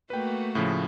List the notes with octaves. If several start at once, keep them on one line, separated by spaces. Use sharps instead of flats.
A3 A#3 F#4 B4 G5
A2 C#3 F3